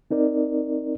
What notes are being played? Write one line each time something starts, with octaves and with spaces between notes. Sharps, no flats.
C4 D#4 A#4 D5